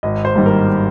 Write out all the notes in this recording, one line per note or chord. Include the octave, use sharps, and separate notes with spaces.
G#1 D#5
C5
G2 D#3 G3 A#3
A#4